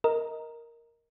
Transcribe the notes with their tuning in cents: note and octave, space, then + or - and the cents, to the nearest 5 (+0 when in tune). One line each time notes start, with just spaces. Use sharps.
A#4 +0 D#5 +15